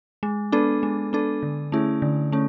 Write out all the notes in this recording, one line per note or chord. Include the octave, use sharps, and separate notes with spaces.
G#3
B3 D4 A4
G#3
B3 D4 A4
D3
A3 C#4 E4 G#4
D3
A3 C#4